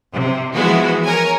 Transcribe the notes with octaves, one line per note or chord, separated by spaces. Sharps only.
C3
E3 F3 G#3 B3 E4 F#4
A#4 C#5 G#5